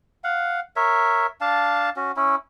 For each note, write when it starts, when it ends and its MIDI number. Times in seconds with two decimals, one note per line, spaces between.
0.24 0.60 77
0.24 0.60 78
0.76 1.27 70
0.76 1.27 73
0.76 1.27 76
1.41 1.90 62
1.41 1.90 77
1.41 1.90 81
1.96 2.12 61
1.96 2.12 66
2.16 2.36 61
2.16 2.36 64